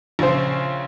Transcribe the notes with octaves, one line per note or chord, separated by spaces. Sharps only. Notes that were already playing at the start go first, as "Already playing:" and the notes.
A#1 C#3 C5